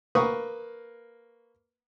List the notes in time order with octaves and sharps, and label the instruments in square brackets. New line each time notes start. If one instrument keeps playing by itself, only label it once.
[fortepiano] A#3 B4 C#6 D#6